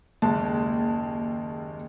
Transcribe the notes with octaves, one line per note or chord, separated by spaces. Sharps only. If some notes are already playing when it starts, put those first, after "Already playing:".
F#1 D#2 G#3 A5